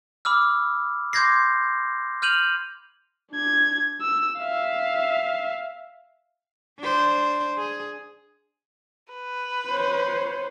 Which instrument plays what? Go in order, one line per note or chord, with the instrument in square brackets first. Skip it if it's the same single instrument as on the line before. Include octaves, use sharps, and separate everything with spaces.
[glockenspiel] B5 D6 E6 F6
C6 D6 G6 G#6 A#6 C7
F6 G6 D#7 F7 F#7
[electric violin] D4 G#6
E6
E5 F5
[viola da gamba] D4 C5
G#4
[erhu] B4
[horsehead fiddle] C5 C#5